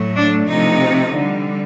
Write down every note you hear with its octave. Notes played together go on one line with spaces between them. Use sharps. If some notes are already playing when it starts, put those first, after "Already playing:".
Already playing: A2 F#3 A3
D4
C3 F3 A3 D#4
D3 G3